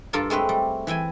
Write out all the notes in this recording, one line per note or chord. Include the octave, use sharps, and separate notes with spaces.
G2 F4 A4 A#4 A5
G#3 A3 C4 B4
G3
E3 E5 G5 G#5